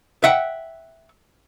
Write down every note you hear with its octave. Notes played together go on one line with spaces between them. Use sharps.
E5 F#5 G5